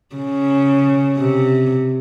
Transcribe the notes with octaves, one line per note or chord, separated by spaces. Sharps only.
C#3
C3